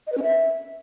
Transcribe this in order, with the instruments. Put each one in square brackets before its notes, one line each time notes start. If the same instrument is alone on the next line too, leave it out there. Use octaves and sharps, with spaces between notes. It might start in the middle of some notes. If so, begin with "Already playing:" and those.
[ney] D#5
B4
C#4
E5